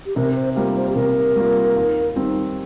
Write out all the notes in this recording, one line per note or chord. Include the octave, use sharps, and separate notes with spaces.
G4
C3 A#4
C5
G3 A#3 F4 A#4
C5
G4
C3 A#4
G3 A#3 F4
D#2
D#3 G3 C4